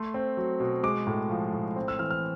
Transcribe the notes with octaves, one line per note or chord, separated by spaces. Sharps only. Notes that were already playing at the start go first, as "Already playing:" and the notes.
Already playing: A3 C6
C4
F#3
B2
G#3 D6
A2
F3
A2
C4
E6
E3 F6
F6